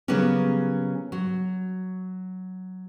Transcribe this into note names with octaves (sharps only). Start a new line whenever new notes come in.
C#3 F#3 G3 A#3 B3 C#4
F#3